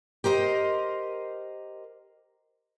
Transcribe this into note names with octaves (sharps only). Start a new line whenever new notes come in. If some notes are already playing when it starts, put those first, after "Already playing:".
G4 A#4 C5 D#5